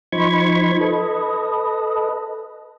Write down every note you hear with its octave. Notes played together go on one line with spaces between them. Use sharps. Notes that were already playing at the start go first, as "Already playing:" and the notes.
F3 D#4 C5 B5 C#6 G#6
A4 B4 D#5